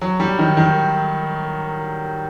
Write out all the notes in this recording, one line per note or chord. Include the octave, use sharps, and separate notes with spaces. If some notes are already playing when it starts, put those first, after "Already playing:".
F#3
G3
D#3
D#3